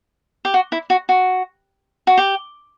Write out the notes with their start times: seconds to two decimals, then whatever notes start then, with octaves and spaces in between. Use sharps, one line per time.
0.45 G4
0.54 F#4
0.72 E4
0.90 F#4
1.09 F#4
2.07 F#4
2.17 G4